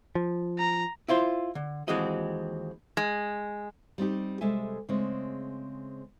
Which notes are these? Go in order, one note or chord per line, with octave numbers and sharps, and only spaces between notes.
F3
A#5
E4 F4 C5
D3
D#2 E3 G#3 C4 F#4 D#5
G#3
G3 C4 D#4 G4
C3 G3 G#3 A4 E5 G#5
C#3 G#3 A3 C4